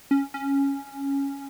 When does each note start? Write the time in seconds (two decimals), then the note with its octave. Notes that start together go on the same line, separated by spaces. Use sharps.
0.11 C#4
0.34 C#4